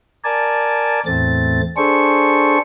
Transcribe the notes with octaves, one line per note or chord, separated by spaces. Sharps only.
A#4 D5 G#5 A5
E2 A2 A3 C4 A6
D4 G#4 A4 C5 C#6